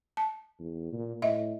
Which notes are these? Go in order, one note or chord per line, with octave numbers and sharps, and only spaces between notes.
A5
E2
A#2
A2 D#5 E5